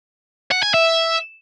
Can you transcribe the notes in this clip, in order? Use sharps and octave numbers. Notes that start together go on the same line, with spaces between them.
F#5
G#5
E5